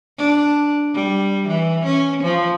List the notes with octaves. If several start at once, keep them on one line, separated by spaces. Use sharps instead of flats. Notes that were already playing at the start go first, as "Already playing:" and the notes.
D4
G3
E3
C#4
F3